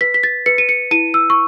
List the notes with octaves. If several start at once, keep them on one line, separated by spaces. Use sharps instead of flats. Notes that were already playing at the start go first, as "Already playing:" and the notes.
B4 B6
B6
A6
B4 C#7
D#7
C#7
E4 D#7
E6
C#6